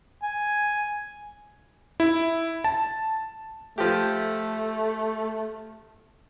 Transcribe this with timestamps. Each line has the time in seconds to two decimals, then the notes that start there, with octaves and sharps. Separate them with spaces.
0.23 G#5
2.00 E4
2.64 A5
3.78 F3 A3 G4